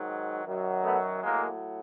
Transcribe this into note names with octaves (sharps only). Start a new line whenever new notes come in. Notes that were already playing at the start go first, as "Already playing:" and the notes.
Already playing: G#2 D#3 F#3
F#2 D#3 F#3
A3 B3
A2 F#3 G#3 A#3